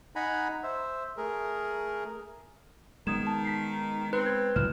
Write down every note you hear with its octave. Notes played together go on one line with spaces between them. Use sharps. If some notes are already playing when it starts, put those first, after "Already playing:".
D#4 F#5 G#5 A#5 B5
C5 E5
A3 G#4 A#4
D#3 G#3 A3 B3 D#6 G#6 E7
A5
B6 C7
C4 B4
G#6
C#2 A2 E3 F#3 F6 E7